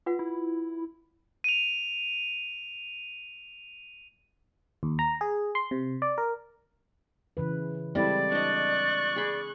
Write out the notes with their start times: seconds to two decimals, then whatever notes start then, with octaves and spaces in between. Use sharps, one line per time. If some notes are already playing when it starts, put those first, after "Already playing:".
0.06 F4 B4 F#5
0.19 E4
1.44 D#7 F7
4.83 D#2
4.99 A#5
5.21 G#4
5.55 C6
5.71 C3
6.02 D5
6.18 A#4
7.37 C#3 E3 B4
7.95 G3 G#3 C4 E4 A4 D5
8.32 D4 D#5 C#6 F#6
9.16 G#4 B5